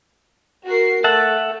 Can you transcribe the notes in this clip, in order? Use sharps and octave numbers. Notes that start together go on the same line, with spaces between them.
F#4 A#4 C7
A3 E5 F#5 A5